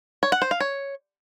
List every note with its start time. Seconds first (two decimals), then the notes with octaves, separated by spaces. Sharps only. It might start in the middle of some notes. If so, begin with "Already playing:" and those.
0.23 C#5
0.32 F#5
0.42 C5
0.51 F5
0.60 C#5